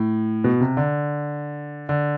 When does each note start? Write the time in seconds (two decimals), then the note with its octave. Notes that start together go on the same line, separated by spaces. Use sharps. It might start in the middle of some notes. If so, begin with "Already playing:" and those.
Already playing: A2
0.44 B2
0.61 C3
0.77 D3
1.89 D3